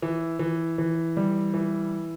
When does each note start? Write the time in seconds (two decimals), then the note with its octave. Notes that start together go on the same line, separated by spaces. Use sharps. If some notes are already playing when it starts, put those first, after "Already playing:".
0.02 E3
0.39 E3
0.78 E3
1.17 G3
1.54 E3